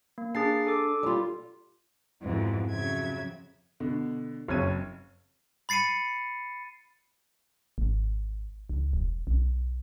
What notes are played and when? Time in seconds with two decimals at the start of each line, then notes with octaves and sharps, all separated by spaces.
0.18 A#3
0.35 D4 G#4 A#5 A6 C7
0.67 A4 D6
1.03 G3 F4
2.22 F2 G#2 B2 E3
2.70 F2 C#3 F#3 E5 G#6
3.80 B2 D3
4.48 F#1 F2 C#5 G#6 D#7
5.69 B5 A6 C7 C#7 D#7
7.78 G#1
8.70 C#2
8.93 E1
9.27 B1